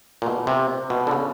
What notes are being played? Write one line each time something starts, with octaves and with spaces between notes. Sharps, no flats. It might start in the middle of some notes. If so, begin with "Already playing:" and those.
A#2
B2
C3
B2
D3
C#3